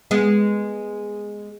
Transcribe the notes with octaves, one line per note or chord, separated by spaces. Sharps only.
G#3 B3